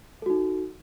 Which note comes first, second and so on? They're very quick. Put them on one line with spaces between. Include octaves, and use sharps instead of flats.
A4 F#4 D#4